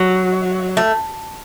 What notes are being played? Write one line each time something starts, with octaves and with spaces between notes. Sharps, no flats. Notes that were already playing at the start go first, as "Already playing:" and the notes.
Already playing: F#3
A3